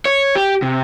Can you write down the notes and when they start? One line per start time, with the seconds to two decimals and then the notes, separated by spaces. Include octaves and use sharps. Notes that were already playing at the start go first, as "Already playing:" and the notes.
0.05 C#5
0.35 G4
0.62 C3